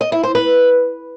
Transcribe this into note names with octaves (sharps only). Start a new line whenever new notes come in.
D#5
E4
C5
B4